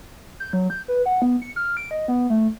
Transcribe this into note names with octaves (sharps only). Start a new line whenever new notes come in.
G6
F#3
G6
B4
F#5
B3
C#7
F6
D7
D#5
B3
A3